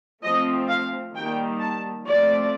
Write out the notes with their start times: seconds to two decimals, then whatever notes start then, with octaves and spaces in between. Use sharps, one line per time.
0.23 F3 A3 C4 D#5
0.69 F5
1.14 D#3 G3 A#3 G5
1.60 A5
2.05 F3 A3 C4 D5